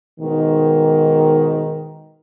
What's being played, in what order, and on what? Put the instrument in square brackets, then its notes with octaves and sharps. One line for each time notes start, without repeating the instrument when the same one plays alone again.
[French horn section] G#2 B2 D#3